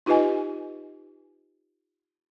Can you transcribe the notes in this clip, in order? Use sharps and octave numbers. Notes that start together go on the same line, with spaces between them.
D#4 F4 G4 B4 D#5 G#5